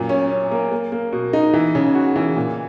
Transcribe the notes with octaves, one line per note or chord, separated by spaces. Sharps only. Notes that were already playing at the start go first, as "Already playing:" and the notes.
Already playing: F#2 A#2
C#4
C#4
A#3
A#3
A#3
B2
D#4
E3
C#3
F#4
E3
A#2